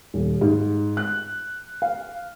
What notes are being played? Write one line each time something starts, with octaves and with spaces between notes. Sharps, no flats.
D#1
G#2
F#6
F5